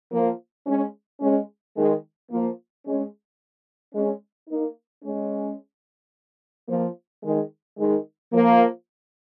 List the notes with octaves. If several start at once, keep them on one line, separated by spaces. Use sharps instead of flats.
F3 A#3
G#3 C#4
G#3 C#4
D#3 G#3
F3 A#3
G#3 C#4
G#3 C#4
A#3 D#4
G#3 C#4
F3 A#3
D#3 G#3
D#3 G#3
F3 A#3